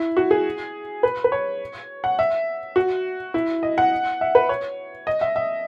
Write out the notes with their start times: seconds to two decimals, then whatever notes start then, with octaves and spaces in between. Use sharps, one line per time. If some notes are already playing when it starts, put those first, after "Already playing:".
Already playing: E4
0.17 F#4
0.31 G#4
1.03 B4
1.24 B4
1.32 C#5
2.04 F#5
2.19 E5
2.76 F#4
3.34 E4
3.63 D#5
3.78 F#5
4.21 E5
4.35 B4
4.49 C#5
5.07 D#5
5.21 E5
5.36 E5